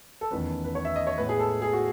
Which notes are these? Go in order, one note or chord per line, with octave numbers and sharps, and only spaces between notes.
A4
E2 D#3 A3 C#4 B4
B4
C#5
E5
D#5
C#5
A2 G#3 B3 B4
G#4
A4
G#4
F#4